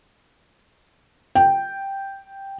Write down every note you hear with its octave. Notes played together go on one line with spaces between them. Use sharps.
G5